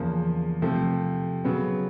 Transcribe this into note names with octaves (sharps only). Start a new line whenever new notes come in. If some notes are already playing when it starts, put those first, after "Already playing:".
Already playing: E2 C#3 F3 A#3
C3 F3 A3
C#3 F#3 B3